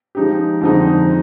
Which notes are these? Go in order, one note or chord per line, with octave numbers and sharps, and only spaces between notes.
F3 G#3 D#4 G4
F2 D3 G#3 C4 D#4